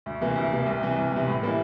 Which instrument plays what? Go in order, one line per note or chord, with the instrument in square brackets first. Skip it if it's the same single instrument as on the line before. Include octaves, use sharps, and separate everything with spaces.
[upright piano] D2
C3 E3 A#3
D2
C3 E3 A#3
C2
C3 E3
C2
C3 E3
A2
E3 G3 A#3 E4